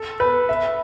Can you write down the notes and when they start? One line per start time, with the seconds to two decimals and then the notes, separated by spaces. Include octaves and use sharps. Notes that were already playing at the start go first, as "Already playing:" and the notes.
Already playing: A4
0.20 B4
0.49 E5